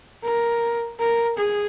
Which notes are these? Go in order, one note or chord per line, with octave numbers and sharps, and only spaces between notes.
A#4
A#4
G#4